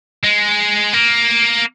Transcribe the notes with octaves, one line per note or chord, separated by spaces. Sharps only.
G#3
A#3